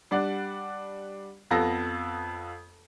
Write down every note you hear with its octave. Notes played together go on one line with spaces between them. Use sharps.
G3 D4 D5 F#5
F2 B3 F4 A4 A#6